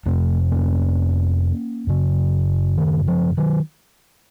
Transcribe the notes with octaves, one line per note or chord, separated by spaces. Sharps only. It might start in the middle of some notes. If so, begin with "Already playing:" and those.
F2 C3 A3 C4
A#3 C#4
F#2 C#3
D#3
F3
D#3 F#3